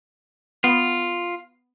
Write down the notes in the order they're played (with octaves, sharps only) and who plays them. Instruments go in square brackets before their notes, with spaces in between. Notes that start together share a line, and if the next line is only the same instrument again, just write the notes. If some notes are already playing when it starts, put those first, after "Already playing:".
[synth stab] B3 [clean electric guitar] F4